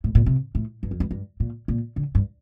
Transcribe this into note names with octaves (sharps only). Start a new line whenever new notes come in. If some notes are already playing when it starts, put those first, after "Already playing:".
A2
A#2
C3
A2
G2
F2
G2
G2
A#2
A#2
D3
G2